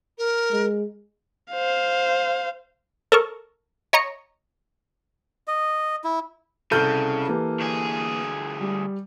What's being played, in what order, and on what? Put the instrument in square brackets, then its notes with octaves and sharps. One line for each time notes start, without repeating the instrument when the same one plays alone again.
[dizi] A#4
[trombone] G#3
[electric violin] C5 F5
[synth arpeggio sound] A4 A#4 C#6
C#5 D#5 A#5 C#7
[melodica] D#5
E4
[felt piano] C2 F6 D#7 [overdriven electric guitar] C#3 [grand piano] A4 G6
[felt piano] E3 A#3 G4
[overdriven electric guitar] D2 G#4
[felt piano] G3